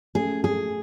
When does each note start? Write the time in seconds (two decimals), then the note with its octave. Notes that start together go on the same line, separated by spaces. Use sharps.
0.15 A3 C#4 G#4
0.44 G#4